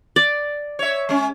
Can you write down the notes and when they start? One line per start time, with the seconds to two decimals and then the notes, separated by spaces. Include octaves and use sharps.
0.16 D5
0.79 C#5 E5
1.09 G#3 C#4